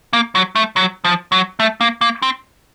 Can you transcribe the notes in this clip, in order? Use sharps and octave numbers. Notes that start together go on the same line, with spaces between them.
A#3
F#3
A3
F#3
F3
F#3
A3
A#3
A#3
C4